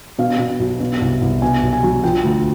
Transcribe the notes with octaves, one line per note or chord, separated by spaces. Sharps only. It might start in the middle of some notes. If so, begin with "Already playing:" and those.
B2 F5
B2
B1
B2
C2
C2
B2 G#5
B1
G#5
F#3
F3 G5
D2